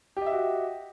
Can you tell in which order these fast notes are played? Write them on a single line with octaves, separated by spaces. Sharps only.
G4 D#5 E5 F#4